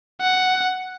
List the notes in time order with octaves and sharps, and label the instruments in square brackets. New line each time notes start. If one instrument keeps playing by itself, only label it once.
[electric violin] F#5